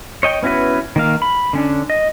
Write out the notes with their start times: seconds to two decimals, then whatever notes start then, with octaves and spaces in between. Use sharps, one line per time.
0.23 C#5 D#5 G5
0.43 B3 C#4 E4 F#4 B4
0.96 D#3 A#3 F5
1.22 B5
1.53 D3 C#4 D4
1.90 D#5